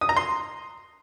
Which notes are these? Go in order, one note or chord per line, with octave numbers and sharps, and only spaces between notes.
D#6
A#5
C6